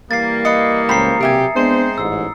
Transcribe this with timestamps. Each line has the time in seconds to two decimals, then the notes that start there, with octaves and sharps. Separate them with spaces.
0.11 E3 G3 A#3 A6 C7
0.45 B4 D#5 D#6 C#7
0.89 C#2 A2 C5 G5 A#5 B5 C7
1.21 B1 C3 G4 A#4 E5 G#5
1.55 G#3 B3 C4 D4 C5
1.98 A1 G#2 E6